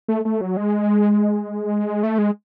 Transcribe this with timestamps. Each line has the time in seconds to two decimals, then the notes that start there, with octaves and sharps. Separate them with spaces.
0.08 A3
0.25 A3
0.41 F#3
0.57 G#3
2.03 A3
2.18 G#3